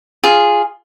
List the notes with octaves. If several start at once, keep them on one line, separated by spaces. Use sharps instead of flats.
F4 G#4